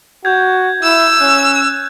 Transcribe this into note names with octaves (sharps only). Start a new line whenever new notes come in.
F#4 G6 G#6
E4 E6
C#4 F#6